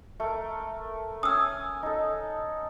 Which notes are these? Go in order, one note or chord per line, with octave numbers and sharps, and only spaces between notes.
A3 A#4
C#4 G#5 D#6 E6
D#4 A4